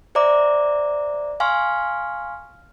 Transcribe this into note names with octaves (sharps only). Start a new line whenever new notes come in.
C5 D5 E5 A#5 D6
F5 G#5 C6 C#6 F6